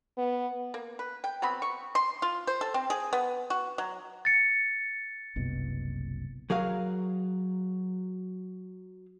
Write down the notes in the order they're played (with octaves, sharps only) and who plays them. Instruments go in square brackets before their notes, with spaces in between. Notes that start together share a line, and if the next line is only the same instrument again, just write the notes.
[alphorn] B3
[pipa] A#3
B4
G5
F#3 B3 C4 B5
C#6
C6
F4
C5
A4
C4
G#4
B3
F#4
F#3
[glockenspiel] A6 C#7
[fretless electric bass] F#1 C2 B2
[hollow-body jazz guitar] F#3 G#4 A#4 F5